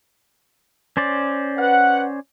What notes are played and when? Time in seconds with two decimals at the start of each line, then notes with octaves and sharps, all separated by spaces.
0.97 C#4 C5 D5
1.58 B4 F#5